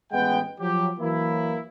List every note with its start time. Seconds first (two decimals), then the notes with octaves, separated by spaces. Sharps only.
0.12 A1 G#3 B3 F#5 G5
0.60 F3 F#3 G4
0.99 E3 F#3 A#3 E4